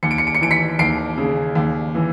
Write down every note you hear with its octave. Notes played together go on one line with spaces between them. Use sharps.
D#2 C#7
D7
C#7
D7
C#7
E3 D7
B6 C#7
D#2 C7 D7
C#3
D#2
E3